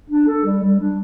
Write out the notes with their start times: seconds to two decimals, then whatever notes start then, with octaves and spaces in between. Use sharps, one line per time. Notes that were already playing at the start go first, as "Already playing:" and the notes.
0.10 D4
0.27 A4
0.45 G3
0.63 G3
0.80 D4